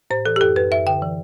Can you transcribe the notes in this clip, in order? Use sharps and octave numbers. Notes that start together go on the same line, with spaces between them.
A2 C5
E3 A4
G4
F#2 A4
F#2 B4
F#2 E5
D3 G5
E3